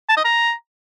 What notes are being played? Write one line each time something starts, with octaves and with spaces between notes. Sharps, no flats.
A5
D#5
A#5